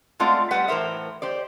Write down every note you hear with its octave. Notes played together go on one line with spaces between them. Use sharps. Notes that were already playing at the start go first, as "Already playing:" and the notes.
G#3 A3 C4 F4 D5 F#5
G3 B4 F#5
A2 E3 A#4 C5 E5
G4 C5 D5